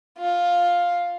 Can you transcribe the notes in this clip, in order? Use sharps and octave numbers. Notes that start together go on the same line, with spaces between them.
F4